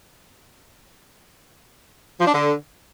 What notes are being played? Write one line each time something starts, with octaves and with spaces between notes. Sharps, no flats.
F3
D4
D3